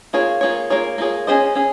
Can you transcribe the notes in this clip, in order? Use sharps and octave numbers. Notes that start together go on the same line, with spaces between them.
A#3 F4 G#4 C#5
A#3 F4 G#4 C#5
A#3 F4 G#4 C#5
A#3 F4 G#4 C#5
C#4 G#4 C5 D#5
C#4 G#4